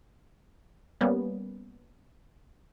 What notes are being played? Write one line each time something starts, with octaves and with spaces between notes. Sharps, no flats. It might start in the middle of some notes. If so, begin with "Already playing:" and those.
G3 A#3 B3 C#4